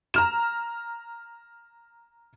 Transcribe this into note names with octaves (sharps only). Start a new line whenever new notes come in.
A#5 F6 E7